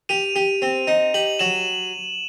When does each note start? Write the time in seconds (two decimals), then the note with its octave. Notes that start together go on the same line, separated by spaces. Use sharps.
0.09 G4 D#7 F7
0.36 G4
0.62 C4
0.87 D#4
1.14 G4 F#7
1.39 F#3 E7 F#7